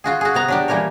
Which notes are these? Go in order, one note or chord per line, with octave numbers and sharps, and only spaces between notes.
F4 F#4 G#4
F#4 G#4
C3 B3 A#5
F#3 D4 G4
A#2 E3 G3 A#4 C#5